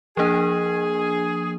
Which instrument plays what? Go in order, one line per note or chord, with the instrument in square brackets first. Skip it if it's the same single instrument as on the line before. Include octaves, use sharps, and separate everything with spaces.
[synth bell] F3 A#3 D4 [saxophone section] G#4